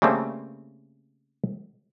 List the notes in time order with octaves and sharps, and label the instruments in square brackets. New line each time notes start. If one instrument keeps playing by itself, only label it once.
[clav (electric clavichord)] C#3 G3 A3 A#3 C4